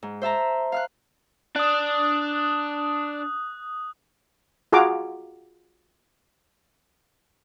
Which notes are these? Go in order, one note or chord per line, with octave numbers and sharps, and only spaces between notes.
G#2
C5 E5 A5 A#5
F5 F6 F#6
D4 D#6 F#6
F4 F#4 G#4 F5 A#5 D6